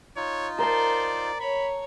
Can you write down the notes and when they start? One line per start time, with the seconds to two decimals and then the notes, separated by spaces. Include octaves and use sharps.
0.17 D#4 F4 C#5
0.58 A#4 C5 D5 A5
1.40 C#5 B5